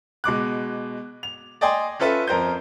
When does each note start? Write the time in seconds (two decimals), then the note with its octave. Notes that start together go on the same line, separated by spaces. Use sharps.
0.24 B2 G#3 D6 F#6
1.23 F7
1.61 D5 D#5 G5 G#5 C6
2.00 C#4 F4 A4 B4 E5
2.28 F2 A#4 C5 G6